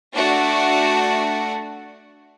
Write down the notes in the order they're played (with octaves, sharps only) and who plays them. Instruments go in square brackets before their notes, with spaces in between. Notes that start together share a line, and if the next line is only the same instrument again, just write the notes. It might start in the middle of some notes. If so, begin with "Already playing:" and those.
[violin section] A3 D4 F#4